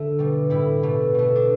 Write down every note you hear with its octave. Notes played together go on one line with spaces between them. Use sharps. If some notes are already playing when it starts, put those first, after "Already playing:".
Already playing: D3 A3
B2 G3
A2 G3 E4
B2 A3
B2 A3
D4